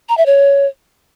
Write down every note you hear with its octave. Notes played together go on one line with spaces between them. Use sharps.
A#5
E5
C#5